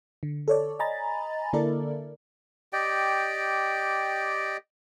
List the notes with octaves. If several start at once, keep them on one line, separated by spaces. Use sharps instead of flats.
D3
A4 C#5 D5
D#5 G#5 A#5 B5 A6
D3 A#3 E4 A4 A#4 D5
G4 D5 D#5 G5